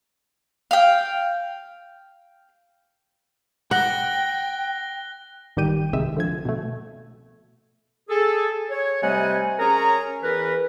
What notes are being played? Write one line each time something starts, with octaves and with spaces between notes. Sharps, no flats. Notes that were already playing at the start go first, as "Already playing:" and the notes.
F5 G5
F#5 G5 F#6 A#6 G7
A1 D#3 G3 G4 G5 D#7
C2 C3 D#3 G#3 E5
D3 F3 G#6
B2 A3
G#4 A4
C#5
C3 G3 A3 D#5 F#5 G#5
C#4 G#4 A#4 C#5 A#5
E2 E3 A#4 B4